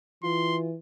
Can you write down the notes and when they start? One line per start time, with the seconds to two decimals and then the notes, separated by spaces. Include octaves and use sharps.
0.23 E3 F4 C6